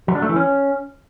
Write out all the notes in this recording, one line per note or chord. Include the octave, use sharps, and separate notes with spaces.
F#3
D4
A3
E3
C#4